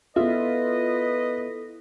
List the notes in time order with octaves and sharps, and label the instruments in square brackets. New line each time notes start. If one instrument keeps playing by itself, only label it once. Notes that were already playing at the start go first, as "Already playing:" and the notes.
[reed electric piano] B3 E5 [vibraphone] E4 A4 [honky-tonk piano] F4 [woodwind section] B4 D#5